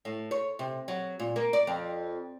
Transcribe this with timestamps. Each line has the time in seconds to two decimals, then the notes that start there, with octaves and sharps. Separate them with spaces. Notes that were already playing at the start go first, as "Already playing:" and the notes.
0.05 A2
0.31 C#5
0.59 C3
0.88 F#3
1.19 A#2
1.36 A#3
1.53 D5
1.67 F2